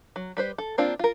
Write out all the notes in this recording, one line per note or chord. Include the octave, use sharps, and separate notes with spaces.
F#3
G3 B4 C5
A4
A#3 C4 D4 F4
F4 A#4